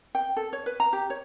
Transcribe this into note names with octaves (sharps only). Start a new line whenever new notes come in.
G5
A4
C#5
B4
A#5
G4
C#5